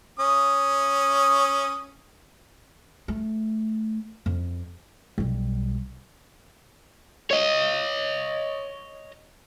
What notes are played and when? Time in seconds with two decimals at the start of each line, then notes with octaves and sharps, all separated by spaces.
0.19 C#4 D#6
3.08 A3
4.26 F2
5.18 B1 G3
7.31 C#5 D#5